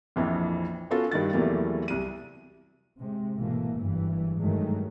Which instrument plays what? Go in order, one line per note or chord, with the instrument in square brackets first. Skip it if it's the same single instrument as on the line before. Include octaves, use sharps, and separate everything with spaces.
[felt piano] A#1 F2 E3
B3 C#4 F4 F#4 A4
G2 D#3 A6
E2 C3 E3 F#3 A3 A#3
C2 D#7
[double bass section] C3 G#3
G#1 B2 E3 A3 A#3
F#1 G2 E3
G2 D#3 F#3 G#3 A3